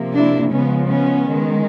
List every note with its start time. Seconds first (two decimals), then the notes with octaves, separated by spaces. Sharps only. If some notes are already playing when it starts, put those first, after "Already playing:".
Already playing: C3 F3 A#3
0.14 D4 E4
0.51 C#3 F3 G#3 B3 C#4
0.87 B3 C#4
1.25 D#3 G#3